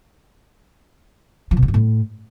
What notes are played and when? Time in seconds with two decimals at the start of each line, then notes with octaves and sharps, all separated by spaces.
1.51 F3
1.57 B2
1.62 D#3
1.68 G2
1.74 A2